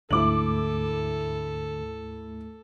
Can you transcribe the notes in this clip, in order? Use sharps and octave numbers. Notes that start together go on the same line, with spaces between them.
D2 G#2 D3 A3 E4 A4 D6 F#7